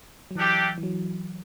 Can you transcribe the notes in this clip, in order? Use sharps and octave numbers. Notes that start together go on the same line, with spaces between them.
F#3
E3 A3 D4 G4
E3
F#3